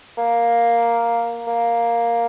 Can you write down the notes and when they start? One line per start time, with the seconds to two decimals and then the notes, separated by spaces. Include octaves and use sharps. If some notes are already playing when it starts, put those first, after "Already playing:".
0.18 A#3
1.47 A#3